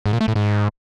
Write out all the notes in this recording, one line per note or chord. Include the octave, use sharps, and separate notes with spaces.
G#2
A#2
A3
A2
G#2